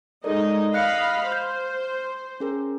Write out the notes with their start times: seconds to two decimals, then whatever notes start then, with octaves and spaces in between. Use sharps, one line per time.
0.24 G#3 D#4 A4 A#4 D5 D#5
0.74 D#5 F5 B5 F#6 A#6 C#7
1.28 C5 F6 G6
2.40 C#4 G#4 A#4